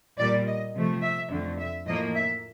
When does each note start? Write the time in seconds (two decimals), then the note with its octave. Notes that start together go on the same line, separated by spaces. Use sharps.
0.18 A#2 G3 A#3 D5
0.47 D#5
0.75 C3 F3 A3
1.03 E5
1.30 F2 D3 F3 A3
1.59 E5
1.86 A2 F3 A#3 D#5
2.14 E5